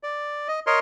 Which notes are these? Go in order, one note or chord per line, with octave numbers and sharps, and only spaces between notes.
D5
D#5
A#4 C#5 D#5 C6